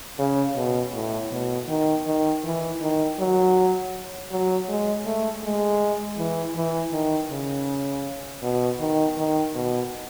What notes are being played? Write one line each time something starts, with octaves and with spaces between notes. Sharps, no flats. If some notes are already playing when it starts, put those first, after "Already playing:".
C#3
B2
A2
B2
D#3
D#3
E3
D#3
F#3
F#3
G#3
A3
G#3
E3
E3
D#3
C#3
B2
D#3
D#3
B2